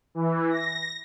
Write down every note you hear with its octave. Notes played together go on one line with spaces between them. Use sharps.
E3
A#6